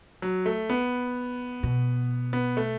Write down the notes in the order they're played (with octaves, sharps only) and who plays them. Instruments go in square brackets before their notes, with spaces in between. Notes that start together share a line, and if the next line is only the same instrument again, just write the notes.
[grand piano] F#3
A3
B3
[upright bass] B2
[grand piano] B3
A3